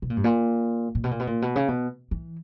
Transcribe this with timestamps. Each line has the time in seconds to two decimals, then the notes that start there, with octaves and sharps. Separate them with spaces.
0.02 B2
0.10 A#2
0.17 G2
0.24 A#2
0.95 A#2
1.04 B2
1.11 A#2
1.20 B2
1.27 A#2
1.42 B2
1.56 C#3
1.68 B2
2.11 E3